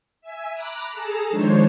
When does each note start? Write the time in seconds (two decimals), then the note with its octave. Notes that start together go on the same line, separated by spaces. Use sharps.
0.21 E5 G#5
0.53 A#5 B5 D6 F#6 A#6 B6
0.89 G#4 A4 A5 A#5
1.30 D#3 F3 G#3 D4 C5 C#5